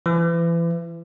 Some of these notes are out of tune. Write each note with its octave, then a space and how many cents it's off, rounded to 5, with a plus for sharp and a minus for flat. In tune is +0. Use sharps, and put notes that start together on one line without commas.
E3 +35